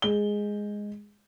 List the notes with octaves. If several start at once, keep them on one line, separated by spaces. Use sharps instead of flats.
G#3 G7